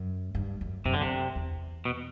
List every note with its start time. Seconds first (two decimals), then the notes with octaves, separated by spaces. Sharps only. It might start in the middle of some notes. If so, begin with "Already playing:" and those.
Already playing: F#2
0.35 G2
0.61 F#2
0.85 F#2 C3
0.94 D3
1.02 C3
1.36 E2
1.85 B2